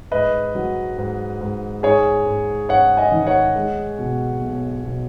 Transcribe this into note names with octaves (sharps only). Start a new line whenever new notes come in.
G#2 B4 D#5
F#3
G#2
G#2
G#2 G#4 C#5
G#2
G#2 C#5 F#5
D#5 G#5
D#3
C#5 F#5
G#3
B2
B1
B2